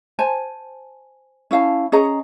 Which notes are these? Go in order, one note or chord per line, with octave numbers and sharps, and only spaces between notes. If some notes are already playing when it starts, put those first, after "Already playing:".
C5 G#5 A5
C#4 E4 F5 A5
C#4 G#4 D#5 A#5